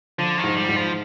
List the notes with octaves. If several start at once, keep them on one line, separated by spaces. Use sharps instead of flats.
D3 F3
D#3
G#2
G3
G#2
F3